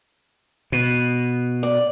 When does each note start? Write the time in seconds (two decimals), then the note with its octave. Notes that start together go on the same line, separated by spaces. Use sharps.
0.72 B2
1.63 D5